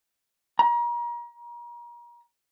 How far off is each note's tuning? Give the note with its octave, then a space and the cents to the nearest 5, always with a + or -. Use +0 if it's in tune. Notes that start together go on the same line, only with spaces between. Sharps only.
A#5 +35